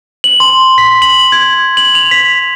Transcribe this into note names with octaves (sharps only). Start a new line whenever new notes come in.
F#7
C6
B6
F#7
G#6
F#7
F7
B6